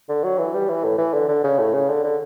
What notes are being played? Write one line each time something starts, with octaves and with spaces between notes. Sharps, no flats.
D3
F#3
E3
G3
E3
A2
E3
D3
D3
C#3
A2
C#3
D3
D3